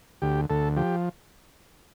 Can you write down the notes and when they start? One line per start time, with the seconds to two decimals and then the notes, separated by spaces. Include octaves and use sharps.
0.22 D2 G4
0.50 D2 A4
0.77 F3 G4